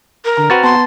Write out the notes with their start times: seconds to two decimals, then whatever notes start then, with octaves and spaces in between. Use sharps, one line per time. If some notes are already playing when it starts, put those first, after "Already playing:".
0.25 A#4
0.37 D3 A#5
0.50 C4 F#4 B4 F6 A6
0.64 B3 A5 C6